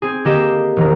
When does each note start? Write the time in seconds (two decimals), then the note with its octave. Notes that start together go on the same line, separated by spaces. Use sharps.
0.02 C4 G#4
0.25 D3 A#3 G4 D#5 E7
0.77 E1 D#3 A#4